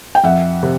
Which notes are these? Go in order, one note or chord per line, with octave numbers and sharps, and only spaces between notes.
G5
F2 E5 F#5
C3